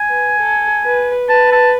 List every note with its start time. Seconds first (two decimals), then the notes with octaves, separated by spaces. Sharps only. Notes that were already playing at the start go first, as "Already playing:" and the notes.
Already playing: G#5
0.08 B4
0.39 A4
0.83 B4
1.29 B4 A5
1.52 A5